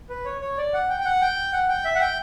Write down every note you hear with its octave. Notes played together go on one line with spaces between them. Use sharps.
B4
C#5
C#5
D5
F#5
G5
G5
F#5
G5
F#5
G5
E5
F#5
G5